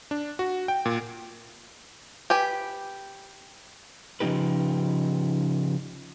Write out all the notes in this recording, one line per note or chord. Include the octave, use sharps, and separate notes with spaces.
D4
F#4
G5
A#2
G4 B4 G#5
C#3 F3 C4 D#4 G4 B4